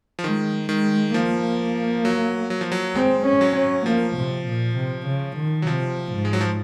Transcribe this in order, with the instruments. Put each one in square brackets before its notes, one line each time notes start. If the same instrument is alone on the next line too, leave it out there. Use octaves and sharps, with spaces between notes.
[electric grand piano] F3
[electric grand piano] D#3 [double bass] G#3
[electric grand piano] D#3 [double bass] G#3
[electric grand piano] F3 [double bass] A#3
[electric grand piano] F#3
F#3
F3
F#3
[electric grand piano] G#3 [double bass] C4
[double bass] C#4
[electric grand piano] F#3
[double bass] C#4
[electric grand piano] F3 [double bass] A#3
[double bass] C3
A#2
C3
C#3
D#3
[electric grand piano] F#3
[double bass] C3 [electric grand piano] F3
[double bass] G#2
[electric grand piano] G#3
F#3
F3